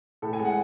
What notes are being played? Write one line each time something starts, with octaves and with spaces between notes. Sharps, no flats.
A2 A4
G#5
G#3
F#5